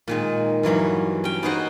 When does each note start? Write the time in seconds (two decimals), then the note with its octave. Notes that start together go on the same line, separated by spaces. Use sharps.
0.08 A#2 D#3 G#3
0.63 G2 E3 F#3 A#3
1.24 C#4 G5
1.43 B3 D#4 F#4 G#4 C5 F#5